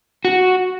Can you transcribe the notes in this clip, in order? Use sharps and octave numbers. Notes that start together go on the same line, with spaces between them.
F#4